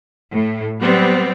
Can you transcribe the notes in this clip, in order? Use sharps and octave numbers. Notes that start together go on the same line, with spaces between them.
A2
F#3 G3 B3 C4